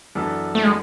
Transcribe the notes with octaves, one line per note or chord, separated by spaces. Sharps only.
F#2 E3 B3 D4 A4
A3
G#3